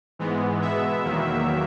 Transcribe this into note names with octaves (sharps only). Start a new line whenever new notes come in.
G#2 E3 G#3 B3
B2 G#3 B3 E5
E2 D#3 F#3 A#3